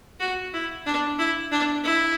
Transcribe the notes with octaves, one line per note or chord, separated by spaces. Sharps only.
F#4
E4
D4
E4
D4
E4